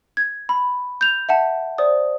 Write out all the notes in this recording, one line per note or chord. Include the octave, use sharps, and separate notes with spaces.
G#6
B5
G6 F7
E5 F#5 A5
C5 D5 D#6